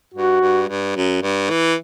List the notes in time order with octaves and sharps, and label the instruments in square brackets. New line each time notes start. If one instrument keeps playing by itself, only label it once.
[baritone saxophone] G2 [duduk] F#4
[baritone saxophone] G2
G2
F#2
G2
E3